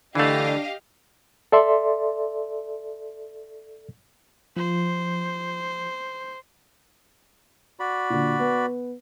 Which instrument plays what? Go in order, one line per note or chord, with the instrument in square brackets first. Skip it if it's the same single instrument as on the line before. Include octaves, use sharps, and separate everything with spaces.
[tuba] D3 [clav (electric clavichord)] E3 A3 [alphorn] D4 [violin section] G4 D#5 F5
[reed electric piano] A4 D5 E5 C6
[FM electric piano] F3 [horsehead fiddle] C5
[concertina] F#4 D5 B5
[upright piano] A#2 D3
B3